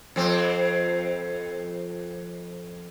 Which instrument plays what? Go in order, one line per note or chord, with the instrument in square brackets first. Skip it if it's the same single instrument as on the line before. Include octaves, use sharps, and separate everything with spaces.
[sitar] F2 C4